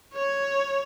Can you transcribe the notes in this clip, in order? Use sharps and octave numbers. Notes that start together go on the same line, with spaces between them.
C#5